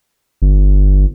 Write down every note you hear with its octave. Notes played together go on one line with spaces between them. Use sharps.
G1